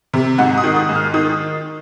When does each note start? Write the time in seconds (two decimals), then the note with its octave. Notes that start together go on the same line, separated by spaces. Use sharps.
0.13 C3
0.38 G#2 F#5
0.57 D#6
0.64 D#3
0.76 D#6
0.89 G#2
0.95 F6
1.14 D#3 D#6